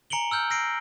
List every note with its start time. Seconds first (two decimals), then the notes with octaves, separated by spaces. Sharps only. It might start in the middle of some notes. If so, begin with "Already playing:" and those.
0.10 G#5 A#5 C#7 D7 F#7 G7
0.31 E6 F6 G6
0.50 E6 A#6 C7 D7